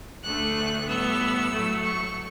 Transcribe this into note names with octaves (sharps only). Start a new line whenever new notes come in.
D2 D3 A3 F#6
A2 G3 B3 E6
A2 F#3 A3
C#6